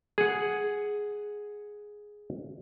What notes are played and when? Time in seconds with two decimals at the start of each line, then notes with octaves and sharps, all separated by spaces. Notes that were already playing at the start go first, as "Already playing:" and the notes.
0.18 G#4 F#5